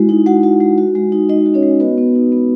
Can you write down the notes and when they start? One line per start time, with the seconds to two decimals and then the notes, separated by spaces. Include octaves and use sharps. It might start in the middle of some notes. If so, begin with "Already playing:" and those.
Already playing: G#3 E4 F#4
0.09 D#4
0.26 G#3 F#4 F#5
0.43 F#4
0.60 G#3
0.78 F#4
0.95 G#3
1.12 D#4
1.29 G#3 D#4 D#5
1.46 F#4
1.54 C#4 C#5
1.63 G#3
1.80 B3 F#4 B4
1.98 B3
2.15 D#4
2.32 B3